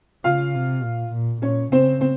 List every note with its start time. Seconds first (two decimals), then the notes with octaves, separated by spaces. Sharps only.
0.24 C#3 F4 F5
0.54 C3
0.83 A#2
1.13 A#2
1.42 A#2 C#4 C#5
1.71 C#3 C4 C5
2.01 C4 C5